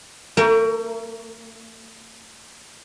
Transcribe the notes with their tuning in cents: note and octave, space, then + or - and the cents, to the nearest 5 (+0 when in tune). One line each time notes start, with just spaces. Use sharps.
A3 +40 A#4 +5